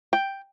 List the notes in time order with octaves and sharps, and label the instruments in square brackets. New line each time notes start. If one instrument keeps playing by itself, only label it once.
[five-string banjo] G5